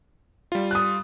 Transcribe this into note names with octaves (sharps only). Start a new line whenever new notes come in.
G3 F4
D#6 F#6